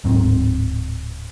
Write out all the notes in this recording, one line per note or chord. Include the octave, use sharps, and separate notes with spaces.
D1 G#2 F#3 C4